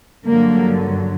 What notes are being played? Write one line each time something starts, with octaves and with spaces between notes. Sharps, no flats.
G2 D3 F#3 A#3